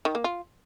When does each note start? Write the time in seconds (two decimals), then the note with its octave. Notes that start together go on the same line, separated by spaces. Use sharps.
0.05 D#3
0.15 A#3
0.24 F4